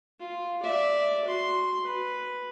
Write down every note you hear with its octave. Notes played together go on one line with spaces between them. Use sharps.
F4
D5 E5
F#4 C6
B4